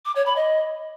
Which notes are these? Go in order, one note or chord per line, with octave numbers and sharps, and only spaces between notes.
D6
C#5
B5
D#5